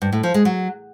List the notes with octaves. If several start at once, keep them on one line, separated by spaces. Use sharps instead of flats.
G2
A2
F3
G#3
F#3